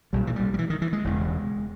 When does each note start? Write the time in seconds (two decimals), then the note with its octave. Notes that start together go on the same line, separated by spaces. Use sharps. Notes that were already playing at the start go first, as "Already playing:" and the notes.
0.13 B1 A#2 G3
0.27 E3
0.36 G3
0.54 G3
0.58 E3
0.70 D#3
0.82 E3
0.93 G#3
1.04 E1 E2 C#3